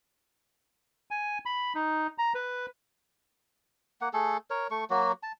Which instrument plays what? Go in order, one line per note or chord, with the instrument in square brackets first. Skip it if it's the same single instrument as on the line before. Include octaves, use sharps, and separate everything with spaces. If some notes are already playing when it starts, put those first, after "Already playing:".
[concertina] G#5
B5
D#4
A#5
B4
[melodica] A#3 F#5
A3 G#4 A4
A#4 C#5
A3 C#6
F#3 A#3 F#4
A5